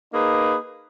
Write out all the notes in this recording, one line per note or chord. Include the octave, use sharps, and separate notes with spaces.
A#3 D#4 G#4 B4